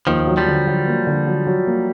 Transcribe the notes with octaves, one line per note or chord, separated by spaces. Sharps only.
D#2 D#3 F3
F#3
F3 G3
D3
F#3
A#3
D3
F#3
F#3
A#3